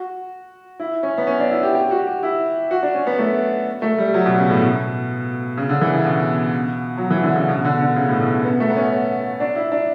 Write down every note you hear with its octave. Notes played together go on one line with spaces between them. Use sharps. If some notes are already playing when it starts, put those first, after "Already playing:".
Already playing: F#4
E4
C#4
B3
C#4
D4
E4
G4
G4
F#4
G4
E4
F#4
D4
C#4
B3
A3
A3
G3
F#3
B2
C#3
A2
B2
C#3
D3
E3
C#3
B2
F#3
E3
D3
C#3
B2
D3
D3
C#3
A2
B2
B3
A3
B3
C#4
D4
E4
D4